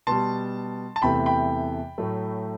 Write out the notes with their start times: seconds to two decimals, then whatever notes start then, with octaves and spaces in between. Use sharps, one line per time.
0.07 B2 G3 A5 C6
0.96 A5
1.02 E2 C3 E3 A3 G5 B5
1.26 G5 B5
1.98 A2 F#3 A3